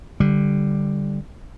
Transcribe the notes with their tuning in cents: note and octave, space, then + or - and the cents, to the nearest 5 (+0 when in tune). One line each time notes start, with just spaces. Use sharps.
D3 +0 G3 +0